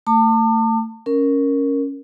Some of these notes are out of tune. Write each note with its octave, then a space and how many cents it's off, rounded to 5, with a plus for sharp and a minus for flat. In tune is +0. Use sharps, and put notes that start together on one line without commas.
A3 +30 A5 +35 D6 +40
C#4 +0 A#4 +0